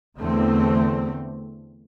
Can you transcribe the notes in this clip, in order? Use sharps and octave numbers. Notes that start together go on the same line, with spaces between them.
E2 D3 A3 C4